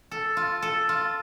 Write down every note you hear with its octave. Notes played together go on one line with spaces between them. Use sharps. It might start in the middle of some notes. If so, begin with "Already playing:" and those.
A4
F4
A4
F4